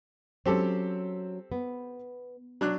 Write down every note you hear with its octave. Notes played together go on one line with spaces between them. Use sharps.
F#3 C4 C#4 G4 A4
B3
F#3 D4 F#6